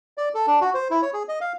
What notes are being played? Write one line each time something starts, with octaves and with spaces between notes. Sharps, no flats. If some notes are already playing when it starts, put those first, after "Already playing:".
D5
A4
D4
F#4
C5
E4
C#5
G#4
D#5
F5